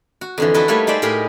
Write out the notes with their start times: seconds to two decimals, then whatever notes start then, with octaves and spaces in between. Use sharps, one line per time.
0.21 F#4
0.38 F2 D3 E3
0.54 D#4 E4 F#4 A4 B4 D#5
0.68 G3 A3 A#3 B4 C#5
0.87 D#4 G#4 C5 D5 E5
1.02 A2 G4 G#4 A#4 D#5 B5